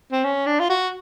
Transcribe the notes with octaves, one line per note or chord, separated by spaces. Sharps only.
C4
C#4
D4
F4
F#4